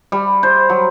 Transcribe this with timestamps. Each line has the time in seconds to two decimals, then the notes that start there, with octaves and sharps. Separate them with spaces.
0.12 G3
0.43 C5
0.69 F#3